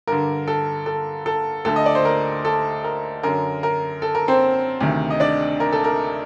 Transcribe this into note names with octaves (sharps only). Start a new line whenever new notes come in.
G2 D3 A#4
A4
A4
A4
D2 D3 A4
D#5
D5
C5
A#4
A4
A#4
F#2 D3 A#4
A#4
A4
A#4
C4 C5
D2 C3 D#3
D#5
D4 D5
A#4
A4
A#4